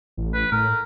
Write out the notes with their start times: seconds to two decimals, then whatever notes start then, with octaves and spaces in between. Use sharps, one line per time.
0.17 A1
0.34 B4
0.52 A2 A#4